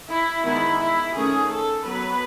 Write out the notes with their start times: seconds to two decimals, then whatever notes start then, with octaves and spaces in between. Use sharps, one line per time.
0.09 E4
0.44 D#3 G#3 B3 E4
0.79 E4
1.14 D#3 A3 C#4 G#4
1.50 A4
1.85 F#3 B3 B4